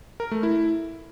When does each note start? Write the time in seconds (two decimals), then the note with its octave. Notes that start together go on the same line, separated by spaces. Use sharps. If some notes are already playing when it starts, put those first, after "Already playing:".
0.20 A#4
0.31 A3
0.43 E4